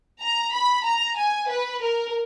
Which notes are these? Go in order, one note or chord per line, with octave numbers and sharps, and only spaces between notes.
A#5
B5
A#5
G#5
B4
A#4